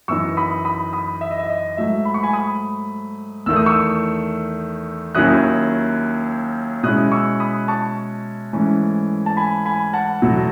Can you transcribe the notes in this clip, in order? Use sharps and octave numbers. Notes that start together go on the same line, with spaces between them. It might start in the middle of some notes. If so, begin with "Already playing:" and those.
F#2 E3 B3 D#4 C#6 E6
B5 D#6
B5 D#6
B5 D#6
E5
D#5
E5
D#5
G#2 F#3 A3 E5
B5
C#6
G#5 B5
B5 D#6
E2 D#3 A3 E6
D#6
C#6 E6
D#2 D#3 F#3 C#4 E4 D#6 F#6
B2 G#3 C#4 E4 D#6 F#6
C#6 E6
B5 D#6
A5 C#6
G#2 E3 A3 C#4 E4
A5
G#5 B5
G#5 B5
F#5 A5
E2 B2 F#3 A3